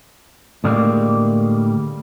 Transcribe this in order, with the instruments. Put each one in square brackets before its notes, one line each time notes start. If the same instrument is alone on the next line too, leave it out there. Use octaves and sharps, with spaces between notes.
[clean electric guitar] A2 D3 G3 G#3 A#3